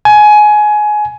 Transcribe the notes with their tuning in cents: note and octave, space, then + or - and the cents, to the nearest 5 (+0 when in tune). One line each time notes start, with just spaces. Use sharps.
G#5 +20